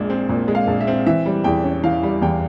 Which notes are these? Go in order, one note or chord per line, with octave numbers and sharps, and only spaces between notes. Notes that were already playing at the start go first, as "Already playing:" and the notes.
Already playing: A#1 A#2 G#3
C4
A#2
G#3
F5
A#1
E5
C4
E3 E5
G3
E2 G5
C#4
E3 F5
G3
E2 G5